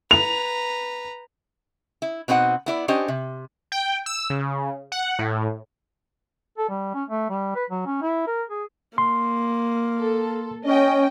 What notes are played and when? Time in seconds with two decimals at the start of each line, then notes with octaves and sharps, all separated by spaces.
0.11 B4 A#5 F7
2.02 E4
2.28 B2 C4 D#4 C5 F#5
2.66 B3 E4 D5
2.88 C#4 D4 G4 C5 D#5
3.08 C3
3.72 G5
4.06 E6
4.30 C#3
4.92 F#5
5.19 A2
6.58 A4
6.69 G3
6.94 C#4
7.09 A3
7.30 G3
7.55 B4
7.70 F#3
7.86 C#4
8.02 E4
8.27 A#4
8.49 G#4
8.98 A#3 C6
10.00 A4
10.65 C#4 D#5 G5